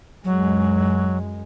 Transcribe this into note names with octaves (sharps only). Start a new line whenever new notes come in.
F#2 F#3 G#3